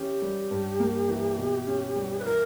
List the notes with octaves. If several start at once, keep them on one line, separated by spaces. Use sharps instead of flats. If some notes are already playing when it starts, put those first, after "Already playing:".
Already playing: E3 C#4 G4
G3
G2
A#3
E3
B2
C#4
G3
B4
E3 A#4